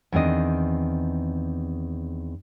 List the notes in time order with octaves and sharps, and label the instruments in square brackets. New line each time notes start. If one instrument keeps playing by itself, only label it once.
[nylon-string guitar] E2 D#3 C4 D4 D#5